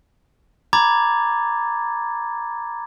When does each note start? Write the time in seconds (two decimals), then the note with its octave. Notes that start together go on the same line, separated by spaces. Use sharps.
0.73 A#5 B5 D6 G#6 A6